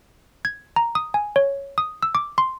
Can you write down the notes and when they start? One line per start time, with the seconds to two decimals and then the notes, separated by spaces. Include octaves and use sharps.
0.45 G#6
0.76 A#5
0.95 D#6
1.14 G#5
1.36 C#5
1.78 D#6
2.03 E6
2.15 D6
2.38 C6